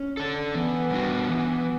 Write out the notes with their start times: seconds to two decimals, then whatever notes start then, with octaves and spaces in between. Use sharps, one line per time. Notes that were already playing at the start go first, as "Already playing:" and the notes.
Already playing: C#4
0.17 D4 A4
0.55 E3 B3
0.91 G3 D4 F#4
1.29 E3